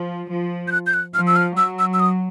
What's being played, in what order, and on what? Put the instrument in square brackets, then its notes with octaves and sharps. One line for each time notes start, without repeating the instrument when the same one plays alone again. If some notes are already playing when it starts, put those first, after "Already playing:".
Already playing: [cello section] F3
F3
[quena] G6
F#6
G6
F#6
[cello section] F3 [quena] F6
[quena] E6
F6
[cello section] F#3 [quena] E6
[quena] E6
E6
D#6